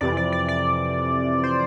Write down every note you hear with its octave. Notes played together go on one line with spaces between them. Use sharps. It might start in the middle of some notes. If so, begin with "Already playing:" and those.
F2 C3 E3 D5
D5
D5
D5
C5